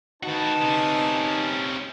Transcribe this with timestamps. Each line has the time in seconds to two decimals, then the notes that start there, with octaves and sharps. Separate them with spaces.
0.23 D#3 D#4 F#4 B4 A5
0.61 C3 C#4